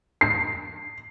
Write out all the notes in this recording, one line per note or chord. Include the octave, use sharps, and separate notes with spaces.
C7